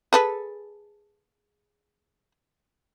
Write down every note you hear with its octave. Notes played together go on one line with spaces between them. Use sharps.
G#4 A4 B4